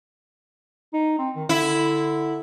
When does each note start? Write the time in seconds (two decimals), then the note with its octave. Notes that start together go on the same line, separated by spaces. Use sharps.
0.93 D#4
1.18 C4
1.36 D#3
1.49 D3 E4